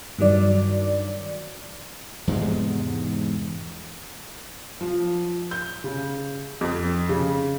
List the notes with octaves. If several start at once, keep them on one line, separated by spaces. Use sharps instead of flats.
G2 D#3 F#3 D5
E2 G#2 C3 G#3
F3
G6
C#3
F2
C#3